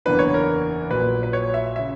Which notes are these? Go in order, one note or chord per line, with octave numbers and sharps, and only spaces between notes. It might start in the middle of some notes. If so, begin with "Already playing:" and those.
F#1 E2 D3 A#3 D4 B4
C#5
A#4
A#1 A#2 F#3 B4
B4
C#5
E5
C#3 E5